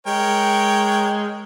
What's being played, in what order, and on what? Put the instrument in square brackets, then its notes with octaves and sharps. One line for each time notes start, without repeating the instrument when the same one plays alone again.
[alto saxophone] G#3 [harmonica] A#4 C#5 G5